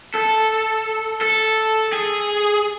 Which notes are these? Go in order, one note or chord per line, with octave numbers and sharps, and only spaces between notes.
A4
A4
G#4